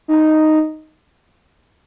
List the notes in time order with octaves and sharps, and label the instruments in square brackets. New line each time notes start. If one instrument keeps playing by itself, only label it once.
[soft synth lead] D#4